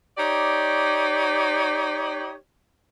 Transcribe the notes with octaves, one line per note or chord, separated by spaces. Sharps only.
D#4 G4 C#5 D5